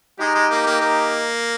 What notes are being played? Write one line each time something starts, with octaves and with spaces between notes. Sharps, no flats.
G#3 D#4 G4
G#3
A#3
A#3
A#3